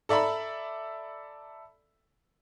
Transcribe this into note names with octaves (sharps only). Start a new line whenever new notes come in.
A4 D5 E5 A#5 B5